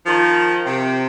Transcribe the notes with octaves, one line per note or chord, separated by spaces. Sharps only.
D#3 F3
C3